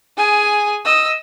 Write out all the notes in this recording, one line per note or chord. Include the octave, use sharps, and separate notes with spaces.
G#4 G#5
D#5 E6